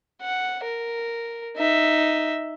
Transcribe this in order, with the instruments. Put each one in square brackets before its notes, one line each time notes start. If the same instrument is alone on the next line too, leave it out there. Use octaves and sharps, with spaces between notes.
[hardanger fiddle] F#5
A#4
D#4 E5